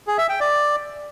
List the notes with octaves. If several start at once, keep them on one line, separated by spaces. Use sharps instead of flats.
G#4
E5
G5
D5